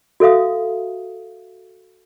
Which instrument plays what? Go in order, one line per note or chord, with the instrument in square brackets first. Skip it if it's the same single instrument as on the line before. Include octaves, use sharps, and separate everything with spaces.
[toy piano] F#4 A4 E5 F5 D#6